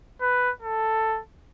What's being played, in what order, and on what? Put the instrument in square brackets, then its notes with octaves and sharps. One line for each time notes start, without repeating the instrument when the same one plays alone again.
[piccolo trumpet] B4
A4